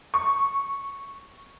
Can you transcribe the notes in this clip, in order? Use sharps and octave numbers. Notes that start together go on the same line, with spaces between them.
C#6